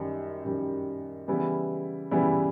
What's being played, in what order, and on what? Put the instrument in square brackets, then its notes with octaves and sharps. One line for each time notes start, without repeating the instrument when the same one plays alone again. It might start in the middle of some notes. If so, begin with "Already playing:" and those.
Already playing: [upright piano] F#2 D#3 G3
F#2 D#3 G3
C#3 E3 G3 B3 E4
C#3 E3 G3 B3 E4